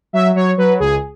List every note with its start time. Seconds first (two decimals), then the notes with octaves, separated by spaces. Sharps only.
0.13 F#3 E5
0.35 F#3 C#5
0.58 F#3 B4
0.80 C#2 G#4